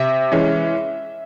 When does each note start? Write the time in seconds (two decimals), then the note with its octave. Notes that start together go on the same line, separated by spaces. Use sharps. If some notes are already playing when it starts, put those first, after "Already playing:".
Already playing: C3 E5
0.32 E3 G#3 C#4